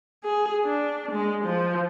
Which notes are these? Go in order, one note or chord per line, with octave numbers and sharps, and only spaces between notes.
G#4
D4
G#3
F3